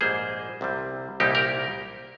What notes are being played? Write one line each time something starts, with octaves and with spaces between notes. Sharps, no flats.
A#1 G#2 G3 A#3 G#4 C5
C2 C3 G3
C2 A#2 G3 A#3 D#4 G4
G4 A#4